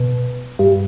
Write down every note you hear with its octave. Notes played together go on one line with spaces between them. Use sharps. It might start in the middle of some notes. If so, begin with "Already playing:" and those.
Already playing: B2
G2